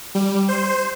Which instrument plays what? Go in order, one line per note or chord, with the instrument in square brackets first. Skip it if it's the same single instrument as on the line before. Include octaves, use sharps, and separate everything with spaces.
[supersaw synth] G3
C5